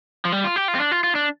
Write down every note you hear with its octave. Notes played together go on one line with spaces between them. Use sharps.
F3
G3
F4
G4
F4
C4
D4
F4
F4
D4